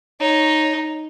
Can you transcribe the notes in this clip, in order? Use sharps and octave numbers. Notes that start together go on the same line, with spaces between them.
D#4 C#5